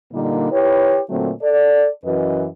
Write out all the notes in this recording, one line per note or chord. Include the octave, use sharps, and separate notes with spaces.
A#2 D3 G3 A#3 D#4
E4 G4 B4 C#5
A#2 D3 F#3 A3 C4
A4 D5
F#2 E3 F#4 B4 D#5